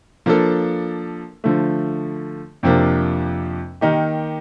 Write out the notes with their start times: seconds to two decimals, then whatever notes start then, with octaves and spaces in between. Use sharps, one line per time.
0.26 F3 A#3 D4 A4
1.44 D3 F3 A3
2.63 F2 C3 F3 A#3 D4
3.81 D#3 A#3 D#4 G4